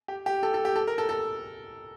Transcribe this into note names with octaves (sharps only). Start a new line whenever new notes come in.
G4
G4
A4
A4
G4
A4
A#4
A4
A4